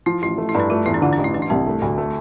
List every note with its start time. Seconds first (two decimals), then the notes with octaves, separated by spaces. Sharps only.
0.06 F3 E4
0.22 A1 E4
0.38 A3
0.49 E4
0.55 G2 D4
0.70 A3 F4
0.86 E2 E4
0.94 D4
1.02 D3 F4
1.13 D4
1.18 A1
1.24 E4
1.34 E3 D4
1.42 E4
1.50 C2 C4
1.67 A3
1.82 D2
1.98 A3